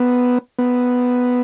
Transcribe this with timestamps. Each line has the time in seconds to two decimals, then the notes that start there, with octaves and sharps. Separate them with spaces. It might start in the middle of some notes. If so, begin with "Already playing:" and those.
Already playing: B3
0.59 B3